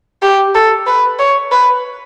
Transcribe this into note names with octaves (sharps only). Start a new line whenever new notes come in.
G4
A4
B4
C#5
B4